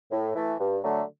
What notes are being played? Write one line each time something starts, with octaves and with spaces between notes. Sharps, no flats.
A2
E3 A3
G2
D3 F#3 A3